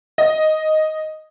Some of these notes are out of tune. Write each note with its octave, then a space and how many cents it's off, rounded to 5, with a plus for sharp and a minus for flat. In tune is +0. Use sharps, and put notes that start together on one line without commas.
D#5 +0